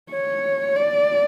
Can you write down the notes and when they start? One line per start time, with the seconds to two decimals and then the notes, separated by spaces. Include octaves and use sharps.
0.10 C#5
0.76 D5